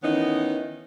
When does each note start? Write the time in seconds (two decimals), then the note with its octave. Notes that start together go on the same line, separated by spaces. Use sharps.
0.04 D#3 E3 B3 C#4 D#4